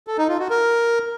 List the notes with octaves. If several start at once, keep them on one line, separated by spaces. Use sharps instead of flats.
A4
D#4
F4
F#4
A#4